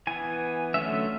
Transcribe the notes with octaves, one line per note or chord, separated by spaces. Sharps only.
E3 B3 G#5
D3 F#3 A3 C#4 E5